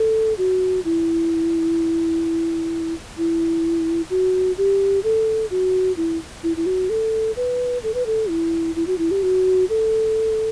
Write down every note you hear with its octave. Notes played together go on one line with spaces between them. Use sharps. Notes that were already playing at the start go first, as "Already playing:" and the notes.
Already playing: A4
F#4
E4
E4
F#4
G4
A4
F#4
E4
E4
E4
F#4
A4
B4
A4
B4
A4
E4
E4
F#4
E4
G4
F#4
A4